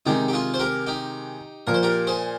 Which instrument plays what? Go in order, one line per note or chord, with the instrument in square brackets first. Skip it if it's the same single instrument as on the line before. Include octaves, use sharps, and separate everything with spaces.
[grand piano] C3 D#3 G#3 [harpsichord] D#4 G4
[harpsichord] G4
F4 G#4
C5
G4 A#4
D#4 G4
[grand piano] A#2 F3 A#3 [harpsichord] A#4
[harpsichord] C5
G4 A#4
G#4 C5